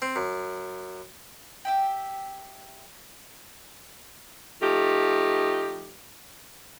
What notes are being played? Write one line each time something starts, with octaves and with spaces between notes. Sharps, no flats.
C4
F#2
G4 E5 G5
F3 A3 D#4 G4